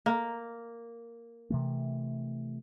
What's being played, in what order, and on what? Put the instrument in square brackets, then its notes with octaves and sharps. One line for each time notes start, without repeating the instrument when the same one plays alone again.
[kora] A#3
[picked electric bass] C3 E3 A3